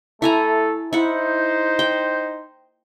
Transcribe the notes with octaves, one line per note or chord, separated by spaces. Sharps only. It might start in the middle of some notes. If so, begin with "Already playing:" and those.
A3 E4 A4 G#5 A#5
D#4 E4 C5 F#5
G5